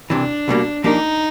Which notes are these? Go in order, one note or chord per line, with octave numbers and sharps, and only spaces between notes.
C2 C3 E3 D4
C2 B2 G3 A#3
F3 A#3 D4 D#4 G4 A#4